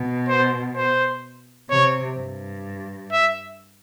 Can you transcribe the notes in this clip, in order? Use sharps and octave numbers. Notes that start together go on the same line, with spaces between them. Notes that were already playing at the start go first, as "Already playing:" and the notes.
Already playing: B2
C5
C5
C3 C#5
G2
E5